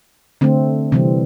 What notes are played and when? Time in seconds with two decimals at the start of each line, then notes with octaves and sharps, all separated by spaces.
0.41 D3 A3 C4
0.92 C3 E3 G3 C4